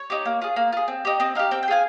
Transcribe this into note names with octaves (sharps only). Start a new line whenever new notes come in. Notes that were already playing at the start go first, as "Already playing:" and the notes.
Already playing: C#5
D#4 G4
A#3
F4 G#4
A#3
F4 G#4
C4
D#4 G4
C4 D#5
D#4 G4 F5
C4 G5
G5
F4 G#4 G#5